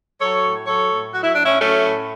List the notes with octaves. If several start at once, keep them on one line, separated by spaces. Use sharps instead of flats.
F#3 A4 C#5
A2
F#3 A4 C#5
A2
F#3 F#4
E4
A2 D4
C#4 E4
F#3 A3 C#4
A2